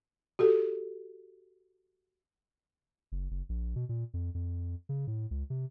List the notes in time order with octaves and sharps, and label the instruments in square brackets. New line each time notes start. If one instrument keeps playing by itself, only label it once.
[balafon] F#4 G4 A4
[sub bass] F#1
F#1
A#1
B2
A#2
F2
F2
C#3
A2
C#2
C3